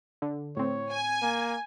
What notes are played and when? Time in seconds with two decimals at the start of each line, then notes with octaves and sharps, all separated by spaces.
0.22 D3
0.57 A2 C4 C#5
0.91 G#5
1.22 A#3